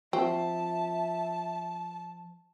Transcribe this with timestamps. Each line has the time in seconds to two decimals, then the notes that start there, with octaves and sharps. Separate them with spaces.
0.13 F3 C4 E5 A5